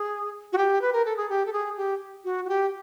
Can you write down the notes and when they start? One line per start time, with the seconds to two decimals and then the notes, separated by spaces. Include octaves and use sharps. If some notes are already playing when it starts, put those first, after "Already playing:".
Already playing: G#4
0.53 F#4
0.58 G4
0.81 B4
0.93 A#4
1.05 A4
1.17 G#4
1.30 G4
1.46 A4
1.53 G#4
1.77 G4
2.25 F#4
2.45 F#4
2.49 G4